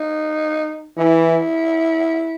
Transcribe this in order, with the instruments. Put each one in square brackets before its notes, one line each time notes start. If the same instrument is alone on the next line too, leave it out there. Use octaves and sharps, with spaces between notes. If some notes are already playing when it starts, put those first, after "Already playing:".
Already playing: [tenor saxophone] D#4
[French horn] E3 [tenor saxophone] E4